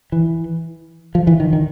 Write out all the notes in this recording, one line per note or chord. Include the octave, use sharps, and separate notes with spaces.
E3
F3
E3
D#3
D#3